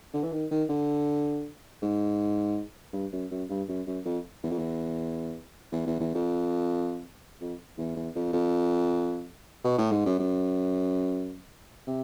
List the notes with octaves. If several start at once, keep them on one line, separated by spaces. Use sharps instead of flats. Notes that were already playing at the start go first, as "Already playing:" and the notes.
D3
E3
D#3
D#3
D3
G#2
G2
F#2
F#2
G2
F#2
F#2
F2
E2
F2
E2
E2
E2
E2
F2
F2
E2
E2
F2
F2
B2
A2
G#2
F#2
F#2
C3